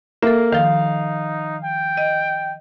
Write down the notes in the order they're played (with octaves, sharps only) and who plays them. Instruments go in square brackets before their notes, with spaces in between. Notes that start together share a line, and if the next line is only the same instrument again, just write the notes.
[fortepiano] A#3 [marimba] A4 E5
[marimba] D#3 F3 [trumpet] D#4 [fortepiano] F5
[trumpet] G5
[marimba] D#5